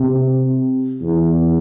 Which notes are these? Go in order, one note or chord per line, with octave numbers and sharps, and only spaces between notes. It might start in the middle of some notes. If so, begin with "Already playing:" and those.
Already playing: C3
E2